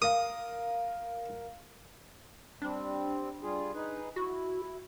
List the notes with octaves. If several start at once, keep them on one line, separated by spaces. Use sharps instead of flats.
A#4 F5 D#6
G3 C4 D4
G3 F4 G#4
D#4 G#4 B4
E4 F#4